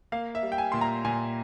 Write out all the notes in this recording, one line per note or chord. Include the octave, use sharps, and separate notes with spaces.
A#3 F5
E5
G3
G5
G#5
A#2 C6
A#5
A#2 G#5